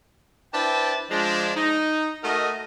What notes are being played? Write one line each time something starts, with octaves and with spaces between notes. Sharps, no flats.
D4 E4 B4 C5 G5 A5
F3 G#3 D4
D#4
A3 F#4 A#4 D#5